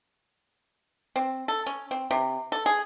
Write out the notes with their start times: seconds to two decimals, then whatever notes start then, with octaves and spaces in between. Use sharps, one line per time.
1.16 C4
1.48 A4
1.66 C#4
1.91 C4
2.11 C3
2.52 A4
2.66 G#4